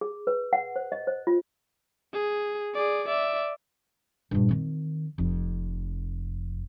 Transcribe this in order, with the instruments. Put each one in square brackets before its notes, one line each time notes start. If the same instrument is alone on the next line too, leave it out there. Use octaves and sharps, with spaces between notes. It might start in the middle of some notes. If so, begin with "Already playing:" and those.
[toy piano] G#4
B4
F#5
C5
D#5
C5
F4
[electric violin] G#4
G#4 D5
D5 E5
[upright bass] G2 A#2
D#3 C4
F1 F2